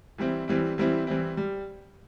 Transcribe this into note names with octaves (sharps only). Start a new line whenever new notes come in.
E3 G3 C4 E4
E3 G3 C4 E4
E3 G3 C4 E4
E3 G3 C4 E4
G3